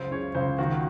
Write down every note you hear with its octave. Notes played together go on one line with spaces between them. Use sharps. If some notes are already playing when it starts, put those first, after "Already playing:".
Already playing: C#2 F#2 C5
C#3 C#5
C#2 C5
D#3 F#4